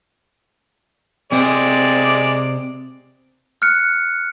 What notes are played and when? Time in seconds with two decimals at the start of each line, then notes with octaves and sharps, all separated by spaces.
1.32 C3 G#3 C4 D5
3.62 F6 F#6 C#7